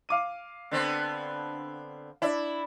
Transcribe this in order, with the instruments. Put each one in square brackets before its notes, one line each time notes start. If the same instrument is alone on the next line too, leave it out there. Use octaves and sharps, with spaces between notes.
[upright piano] F5 D6 D#7
[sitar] D3 B3 C4
[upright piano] D4 [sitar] E4